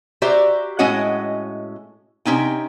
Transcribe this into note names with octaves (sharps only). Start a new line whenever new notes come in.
F#4 G4 C5 D5 E5 A#5
A2 G#3 C#4 F#4 D#5 F#5
C3 C#4 D#4 G5